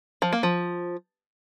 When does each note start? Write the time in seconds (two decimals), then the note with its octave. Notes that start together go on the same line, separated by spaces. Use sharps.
0.22 F3
0.33 A#3
0.43 F3